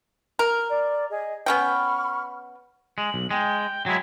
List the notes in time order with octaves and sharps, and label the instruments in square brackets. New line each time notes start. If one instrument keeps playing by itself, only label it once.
[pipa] A#4
[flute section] D5
G#4 D#5
[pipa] B3 C#4 G5 [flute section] B5 C#6 F6
[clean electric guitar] G#3 [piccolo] F#7
[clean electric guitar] B1
[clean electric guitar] G#3 [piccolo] G5
[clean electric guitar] F#3 G#3 E4 [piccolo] G#6